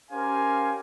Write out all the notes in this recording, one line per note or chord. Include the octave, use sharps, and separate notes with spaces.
C#4 G4 A#4 C5 F5 G#5